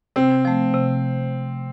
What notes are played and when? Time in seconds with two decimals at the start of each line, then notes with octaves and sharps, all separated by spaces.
0.16 C3 C4
0.45 F3 A3
0.74 C3